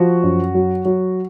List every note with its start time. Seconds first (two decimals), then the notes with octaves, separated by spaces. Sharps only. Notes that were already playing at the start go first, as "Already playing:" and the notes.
Already playing: F3 F#4
0.23 F#2
0.54 F#3
0.85 F#3